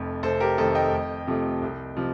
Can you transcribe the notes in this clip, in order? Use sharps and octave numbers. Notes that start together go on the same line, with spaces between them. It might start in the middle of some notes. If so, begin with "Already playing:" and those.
Already playing: F1 F2
F1 A4 C5
G4 A#4
F2 D#3 A3 A4 C5
D#5 G5
F2
C3 F3 A3
C2
C3 F3